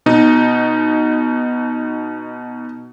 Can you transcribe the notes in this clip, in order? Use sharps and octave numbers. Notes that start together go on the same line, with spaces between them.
B2 D#4